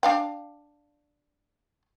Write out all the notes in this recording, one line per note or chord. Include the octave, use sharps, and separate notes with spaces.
D4 F5 G5